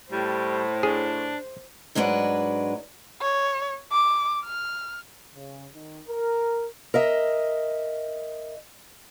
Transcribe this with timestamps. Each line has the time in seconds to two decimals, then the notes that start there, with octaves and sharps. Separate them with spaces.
0.12 A2 G3 C5
0.83 D4 G#4
1.95 G#2 F#3 G#3 D4 B4 F#5
3.21 C#5
3.92 D6
4.46 F6
5.34 C#3
5.74 D#3
6.07 A#4
6.94 A#4 D#5 E5